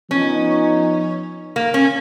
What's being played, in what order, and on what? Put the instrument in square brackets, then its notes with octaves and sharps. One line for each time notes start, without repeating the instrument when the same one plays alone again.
[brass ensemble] F3 B3 D#4 [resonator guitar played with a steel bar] C#4
[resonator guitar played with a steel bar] A#3
C#4